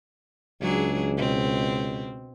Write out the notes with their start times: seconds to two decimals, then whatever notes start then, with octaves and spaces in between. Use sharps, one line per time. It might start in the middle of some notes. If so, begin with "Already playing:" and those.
0.61 C#2 F#3 D4 G#4
1.18 B2 C4